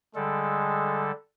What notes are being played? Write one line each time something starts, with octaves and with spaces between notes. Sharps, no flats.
D3 G3 G#3 A4